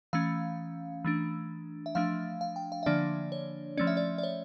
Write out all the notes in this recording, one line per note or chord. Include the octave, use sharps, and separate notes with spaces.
E3 A3 C#4 F5
E3 A3 D4
E5
F3 A3 D4 F5
F5
G5
F5
E5
D3 F3 A#3 D4 D5
C#5
F3 A3 C#4 D5
E5
D5
D5
C#5